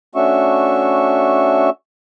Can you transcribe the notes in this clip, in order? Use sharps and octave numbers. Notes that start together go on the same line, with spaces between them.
A3 C#4 D4 F#4 E5 C#6